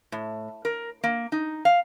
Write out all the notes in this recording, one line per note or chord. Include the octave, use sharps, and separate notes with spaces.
A2
A#4
A#3
D#4
F5